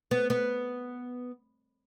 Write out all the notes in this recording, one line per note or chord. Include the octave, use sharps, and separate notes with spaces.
B3
B3